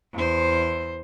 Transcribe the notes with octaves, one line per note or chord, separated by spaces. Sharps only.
E2 C5